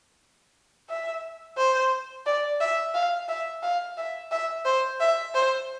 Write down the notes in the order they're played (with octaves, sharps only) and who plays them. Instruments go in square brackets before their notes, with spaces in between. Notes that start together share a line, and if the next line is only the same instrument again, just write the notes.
[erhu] E5
C5
D5
E5
F5
E5
F5
E5
E5
C5
E5
C5